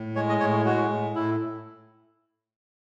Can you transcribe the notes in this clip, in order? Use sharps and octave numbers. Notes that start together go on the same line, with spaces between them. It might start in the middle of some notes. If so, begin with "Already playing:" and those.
Already playing: A2
G#3 C#5
D#5
A2 C#5
G#3 F#4
A2
A2 E4